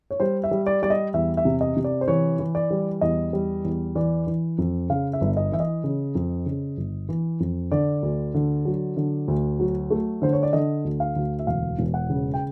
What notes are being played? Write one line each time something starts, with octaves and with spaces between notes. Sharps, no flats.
C#5
G3 C5
E5
G3
D5
G3 D5
D#5
E2 E5
E5
C3
D#5
C3
D5
C5
E3 C#5
E3
D5
G3
E2 D#5
G3
E2
E3 D5
E3
F2
C#3 F5
E5
G1
D#5
E3 E5
D#5
C#3
F2
C#3
G1
E3
F2
D3 D5
D2
D3
F#3
D3
D2
F#3
A3
D3 C5
C#5
D5
D3 D#5
D2
F5
D2
E5
E1 F5
E1
F#5
C#3
G5